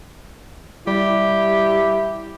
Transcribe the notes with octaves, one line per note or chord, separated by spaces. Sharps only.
G3 E4 G4